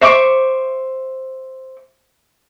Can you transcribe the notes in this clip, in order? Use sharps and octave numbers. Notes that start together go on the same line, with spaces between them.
C5 E5 C#6 D6